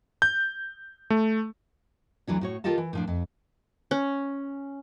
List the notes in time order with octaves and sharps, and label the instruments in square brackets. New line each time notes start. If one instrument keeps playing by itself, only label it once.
[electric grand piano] G6
A3
[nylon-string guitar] D2 E3 F#3 D4
A2 F#4 C#5
D#3 F4 G4 A4 D#5 A5
E3
A2 F3 D4
F2
[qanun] C#4